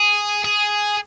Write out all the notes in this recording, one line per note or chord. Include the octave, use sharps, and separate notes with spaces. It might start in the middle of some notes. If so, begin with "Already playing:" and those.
Already playing: G#4
G#4